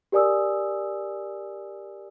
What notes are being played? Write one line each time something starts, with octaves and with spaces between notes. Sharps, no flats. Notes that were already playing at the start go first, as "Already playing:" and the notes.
G4 A#4 D5 G#5 D#6 E6